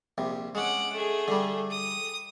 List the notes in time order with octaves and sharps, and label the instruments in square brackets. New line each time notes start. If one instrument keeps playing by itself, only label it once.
[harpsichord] A#1 C3
[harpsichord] G#3 C#4 [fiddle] F#5 D6
[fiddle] A3 G#4
[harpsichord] D3 G3
[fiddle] D#6